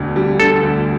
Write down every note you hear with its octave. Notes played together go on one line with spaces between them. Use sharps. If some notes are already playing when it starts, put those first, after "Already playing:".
Already playing: E1 D2 D3
G3
D3 A4
D2